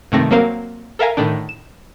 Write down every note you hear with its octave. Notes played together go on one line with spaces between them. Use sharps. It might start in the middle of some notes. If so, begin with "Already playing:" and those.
G2 C3 D#3 A3 C4 A#6
F#3 A#3 C4 A#4 C5 F5
A4 A#4 E5 F5 G#5 A#5
A2 D3 D#3 D4
E7